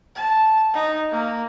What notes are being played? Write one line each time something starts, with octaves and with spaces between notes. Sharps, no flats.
A5
D#4
A#3